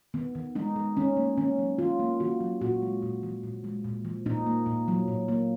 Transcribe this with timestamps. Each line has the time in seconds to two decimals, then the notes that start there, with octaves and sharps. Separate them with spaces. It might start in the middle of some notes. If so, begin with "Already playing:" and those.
0.14 D#3 B3
0.35 D#3
0.55 G#3 D#4
0.76 G#3
0.97 D#3 C#4
1.17 A#3
1.37 D#3 C#4
1.59 F#3
1.78 D#3 F4
2.00 A#3
2.20 D#3 F#4
2.40 F#3
2.61 A#2 F#4
2.82 G#3
3.02 A#2
3.23 F3
3.43 A#2
3.64 G#3
3.84 A#2
4.05 F3
4.26 A#2 D#4
4.46 A#3
4.66 A#2
4.88 F#3
5.08 A#2
5.28 A#3